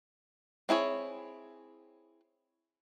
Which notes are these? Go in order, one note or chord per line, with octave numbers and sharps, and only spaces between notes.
C4 E4 G#4 C#5